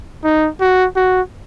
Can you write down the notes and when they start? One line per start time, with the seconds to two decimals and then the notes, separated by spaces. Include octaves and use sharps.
0.24 D#4
0.61 F#4
0.96 F#4